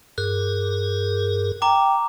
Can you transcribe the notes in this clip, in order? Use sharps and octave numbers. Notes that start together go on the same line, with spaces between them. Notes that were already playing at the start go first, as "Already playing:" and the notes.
G2 G#4 A#4 F#6
G5 A#5 D6